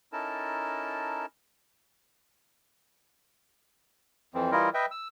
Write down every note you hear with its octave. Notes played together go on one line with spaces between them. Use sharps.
C#4 D#4 E4 A4 A#4 A5
F2 E3 C4
E3 G3 E4 F4 A#4 D#5
B4 D#5 E5 G5
E6